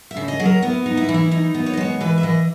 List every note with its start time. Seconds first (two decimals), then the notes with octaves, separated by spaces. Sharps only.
0.11 E5
0.17 C#3
0.28 D#5
0.40 F#3 G#4
0.45 A#4
0.63 B3 E4
0.86 D#4
0.97 E4
1.09 E3
1.14 E4
1.31 D#4 E4
1.55 B3
1.66 C#5
1.73 D#5
1.77 G#3 C#5
2.01 E3 B4
2.18 E5
2.23 E3 D#5